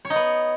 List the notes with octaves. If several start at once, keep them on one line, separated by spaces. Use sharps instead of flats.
C#5
D#4
B3